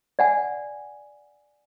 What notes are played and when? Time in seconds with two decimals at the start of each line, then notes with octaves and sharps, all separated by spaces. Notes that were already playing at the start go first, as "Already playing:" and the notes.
0.19 D5 F#5 G#5